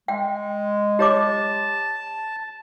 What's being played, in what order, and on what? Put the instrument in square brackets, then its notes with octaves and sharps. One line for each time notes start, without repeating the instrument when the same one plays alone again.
[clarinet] G#3 [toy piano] G5
[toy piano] G4 C#5 D6 [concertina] A5